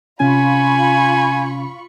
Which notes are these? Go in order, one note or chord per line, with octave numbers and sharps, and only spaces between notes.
C3 C#4 F4 G#5 B5 C#6